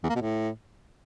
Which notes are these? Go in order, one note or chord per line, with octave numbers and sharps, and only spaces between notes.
E2
A#3
B2
A2